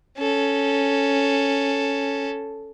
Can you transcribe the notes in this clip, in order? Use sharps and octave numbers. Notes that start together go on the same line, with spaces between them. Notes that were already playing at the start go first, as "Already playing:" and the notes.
C#4 A4